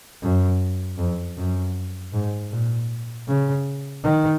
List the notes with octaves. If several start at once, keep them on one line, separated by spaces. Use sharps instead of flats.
F#2
F2
F#2
G#2
A#2
C#3
D#3